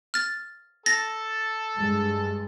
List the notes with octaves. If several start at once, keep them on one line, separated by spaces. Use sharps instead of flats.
F6 A6
A4 A5 A6 A#6
G2 G#3